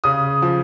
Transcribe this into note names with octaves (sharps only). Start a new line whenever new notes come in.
C#3 D#6
F3